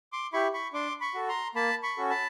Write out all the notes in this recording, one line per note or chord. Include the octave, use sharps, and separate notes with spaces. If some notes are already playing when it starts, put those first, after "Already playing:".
C6 D6
E4 G4 B5 C#6
B5 C#6
D4 C6 D6
B5 C#6
F#4 A4
A#5 C6
A#3 A5 B5
B5 C#6
C#4 F#4 A4
A5 B5